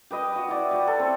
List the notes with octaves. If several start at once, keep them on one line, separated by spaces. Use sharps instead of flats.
G4 B4 D#5
F#4
E4 D5
F#4 G4
A4
C4